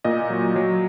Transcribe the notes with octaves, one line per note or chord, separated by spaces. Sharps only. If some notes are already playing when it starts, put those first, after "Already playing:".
A#2 D#5
F#3
F#3